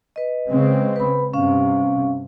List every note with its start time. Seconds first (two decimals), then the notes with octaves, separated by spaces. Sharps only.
0.16 B4 D#5
0.49 C#3 G#3 C4
0.96 B4 B5
1.34 G2 C3 C#4 F5